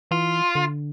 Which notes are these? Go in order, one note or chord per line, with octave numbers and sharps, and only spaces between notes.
E3 F4
D3